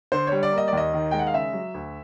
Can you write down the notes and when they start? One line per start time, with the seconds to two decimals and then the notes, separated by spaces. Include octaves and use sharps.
0.12 D3 C5
0.27 G3 C#5
0.43 D5
0.52 A#3
0.58 D#5
0.68 D#2 D5
0.77 D#5
0.94 D#3
1.11 G#3 G5
1.19 F#5
1.27 F5
1.33 C#3 E5
1.53 F#3
1.74 D2